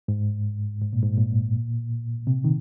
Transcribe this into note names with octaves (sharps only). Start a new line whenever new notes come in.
G#2
G#2
A#2
G#2
A#2
C3
D#3